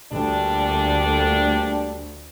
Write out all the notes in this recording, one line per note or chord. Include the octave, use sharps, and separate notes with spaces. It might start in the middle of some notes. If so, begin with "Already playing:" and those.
D2 A#2 G3 D4